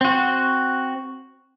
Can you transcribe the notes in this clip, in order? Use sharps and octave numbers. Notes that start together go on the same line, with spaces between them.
C4 F#4